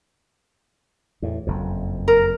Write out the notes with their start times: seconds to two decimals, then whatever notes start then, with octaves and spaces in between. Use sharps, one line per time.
1.22 E2 A2
1.47 F#1 F2
2.08 A#4